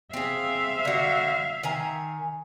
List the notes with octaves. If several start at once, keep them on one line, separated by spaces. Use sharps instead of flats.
C4 G#4 E5 F5
D3 F#4
D#3 G#5 A#5